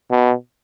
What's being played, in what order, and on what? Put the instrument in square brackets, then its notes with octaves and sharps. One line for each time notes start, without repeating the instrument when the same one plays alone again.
[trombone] B2